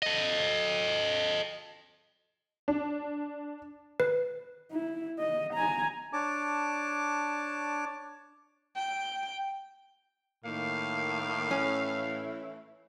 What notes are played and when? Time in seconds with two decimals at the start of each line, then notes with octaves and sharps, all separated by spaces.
0.03 A4 D#5
2.68 D4
4.00 B4
4.72 E4
5.19 D#5
5.53 G#5 A#5
6.13 D4 C#5 A5 D6
8.76 G5
10.45 A2 D#3 A#3 F5
11.51 E3 A3 C#4 E4